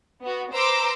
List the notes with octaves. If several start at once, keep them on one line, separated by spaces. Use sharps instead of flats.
B3 F#4
B4 C5 A#5 C6 D6 E6